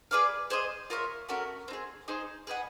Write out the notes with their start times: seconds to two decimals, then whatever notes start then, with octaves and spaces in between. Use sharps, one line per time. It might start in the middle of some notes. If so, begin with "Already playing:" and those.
0.11 G#4 B4 D5 F5
0.50 G#4 C5 D#5
0.90 F4 A#4 C#5 E5
1.29 A3 C#4 F#4 A#4
1.68 C4 D#4
1.73 G#4
2.08 D#4 G#4 C5
2.47 G#4 B4 D#5 F#5